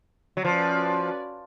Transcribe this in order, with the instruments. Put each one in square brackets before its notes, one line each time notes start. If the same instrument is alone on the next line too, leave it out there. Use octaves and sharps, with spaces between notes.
[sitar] F#3
[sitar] F3 [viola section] C#4 F#4 B4 D5